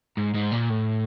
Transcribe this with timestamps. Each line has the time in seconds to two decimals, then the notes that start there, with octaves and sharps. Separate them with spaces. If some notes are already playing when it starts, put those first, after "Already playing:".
0.17 G#2
0.34 G#2
0.52 A#2
0.69 A2